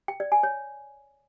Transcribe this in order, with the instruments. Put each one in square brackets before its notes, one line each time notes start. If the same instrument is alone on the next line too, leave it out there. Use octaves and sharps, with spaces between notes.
[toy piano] G5
D5
G#5
C#5